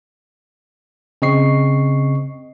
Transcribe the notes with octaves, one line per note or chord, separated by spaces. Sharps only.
C#3 C4 D#5 C#6 C7